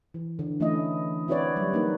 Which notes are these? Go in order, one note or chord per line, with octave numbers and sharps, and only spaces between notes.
E3
D3
E3 A3 C#4 E4 D#5
C4 E4 F#4 B4 C#5 D5
F#3 G3
A#3 D4 D#4 B4